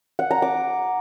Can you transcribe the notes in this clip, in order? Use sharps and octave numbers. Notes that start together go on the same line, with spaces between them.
F#5
A#5
D6